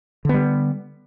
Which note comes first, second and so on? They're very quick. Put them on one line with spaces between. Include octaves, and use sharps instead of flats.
D3 B3 G3